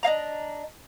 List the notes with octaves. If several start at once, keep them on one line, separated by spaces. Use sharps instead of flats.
D4 D#5 F5 A#5